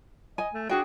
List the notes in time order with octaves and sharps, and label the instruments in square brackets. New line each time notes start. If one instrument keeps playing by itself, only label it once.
[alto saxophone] D#5 [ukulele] G#5
[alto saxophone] A3
[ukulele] D4 G#4 G5 [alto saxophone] F#4